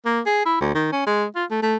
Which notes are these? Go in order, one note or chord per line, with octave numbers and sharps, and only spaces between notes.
A#3
G#4
E4
D2
D#3
C#4
G#3
F4
A3
A3